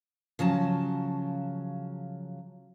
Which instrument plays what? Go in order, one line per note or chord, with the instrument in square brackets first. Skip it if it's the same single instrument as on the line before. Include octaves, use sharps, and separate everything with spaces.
[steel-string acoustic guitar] C#3 F3 F#3 A5